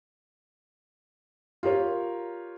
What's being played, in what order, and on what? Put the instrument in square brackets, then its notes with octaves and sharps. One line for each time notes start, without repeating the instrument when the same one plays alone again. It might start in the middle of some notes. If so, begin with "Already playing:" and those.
[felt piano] F4 G4 A#4 C#5